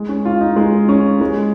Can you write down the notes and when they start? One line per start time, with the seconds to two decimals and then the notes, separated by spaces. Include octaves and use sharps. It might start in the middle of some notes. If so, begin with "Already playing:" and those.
Already playing: G#3
0.09 C#4
0.25 F4
0.41 D#4
0.56 G#3
0.89 C#4
1.21 G#3